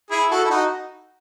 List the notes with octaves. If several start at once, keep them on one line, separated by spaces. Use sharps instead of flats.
E4 G#4
F#4 A4
E4
D#4 F#4